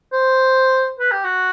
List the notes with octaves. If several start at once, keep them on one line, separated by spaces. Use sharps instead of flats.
C5
B4
G4
F#4